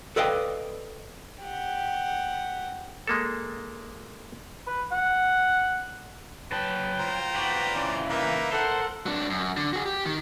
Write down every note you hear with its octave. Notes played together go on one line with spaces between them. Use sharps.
A4 B4 D5 D#5 F5 G5
G4 F#5
G#3 A#3 A4
B4
F#5
F#3 B4 G5 A5
F4 C5 A#5
F#4 B4 D5
C#3 E3 D5
A#3 D#4 B4 E5
A4 A#4 C5 F#5
F#3 D4
F#2
D3
F#4 G#4
G4
D#3